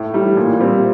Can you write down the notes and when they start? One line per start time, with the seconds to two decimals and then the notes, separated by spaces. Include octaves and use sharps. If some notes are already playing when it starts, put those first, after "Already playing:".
Already playing: A2
0.14 E3 G3
0.37 A#2
0.60 G3 C4